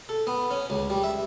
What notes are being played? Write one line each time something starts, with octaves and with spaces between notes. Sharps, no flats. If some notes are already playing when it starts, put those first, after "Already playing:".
A4
B3
C#4
C#2
G3
E5